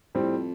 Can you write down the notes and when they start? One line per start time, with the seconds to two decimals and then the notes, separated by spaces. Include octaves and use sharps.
0.15 F2 A2 G3 C4